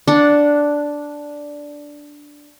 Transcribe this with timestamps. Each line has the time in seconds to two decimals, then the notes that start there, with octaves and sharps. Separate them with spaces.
0.07 D4 F#5